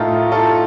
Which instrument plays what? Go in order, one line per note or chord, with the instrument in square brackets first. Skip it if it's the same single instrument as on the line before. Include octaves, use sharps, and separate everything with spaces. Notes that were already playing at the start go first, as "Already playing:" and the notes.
Already playing: [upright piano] A2 A3 D#4 [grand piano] F4 A4 A#4
[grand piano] F4 A4